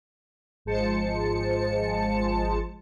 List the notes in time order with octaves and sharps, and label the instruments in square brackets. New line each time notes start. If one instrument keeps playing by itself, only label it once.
[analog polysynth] G#1 F3 G#3 C5 A5 C#7